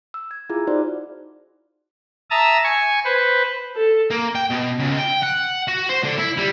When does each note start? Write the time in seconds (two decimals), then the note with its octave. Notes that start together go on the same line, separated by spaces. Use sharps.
0.14 E6
0.31 G#6
0.50 E4 F4 G#4
0.67 D#4 F#4 C5 D5
2.30 E5 A5 A#5 D#6 E6
2.64 G#5 C#6
3.05 B4 C5
3.76 A4
4.11 A#3
4.35 G5
4.50 B2
4.78 C#2
4.98 G5
5.22 F#5
5.68 F#4
5.89 C5
6.03 D3
6.18 E4
6.37 G3